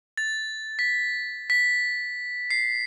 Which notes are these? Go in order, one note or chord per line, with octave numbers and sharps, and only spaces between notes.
A6
B6
B6
C7